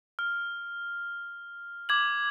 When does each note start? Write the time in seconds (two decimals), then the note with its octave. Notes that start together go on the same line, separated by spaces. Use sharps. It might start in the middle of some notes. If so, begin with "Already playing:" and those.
0.19 F6
1.89 D6 G#6 F#7